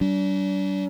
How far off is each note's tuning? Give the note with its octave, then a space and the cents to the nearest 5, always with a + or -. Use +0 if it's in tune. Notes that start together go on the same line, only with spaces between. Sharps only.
G3 -45 D4 -35